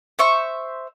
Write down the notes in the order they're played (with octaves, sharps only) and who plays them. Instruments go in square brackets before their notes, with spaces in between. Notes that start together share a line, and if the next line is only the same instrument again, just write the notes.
[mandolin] C5 E5 C#6